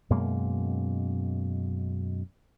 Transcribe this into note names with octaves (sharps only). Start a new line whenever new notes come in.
F#2 B2 G#3 A#3